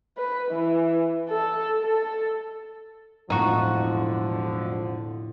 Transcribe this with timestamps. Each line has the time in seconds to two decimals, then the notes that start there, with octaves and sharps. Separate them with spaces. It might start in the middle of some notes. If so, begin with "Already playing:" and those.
0.17 B4
0.51 E3
1.30 A4
1.81 A4
3.30 E1 F2 A2 D3 F3 D#4 F#4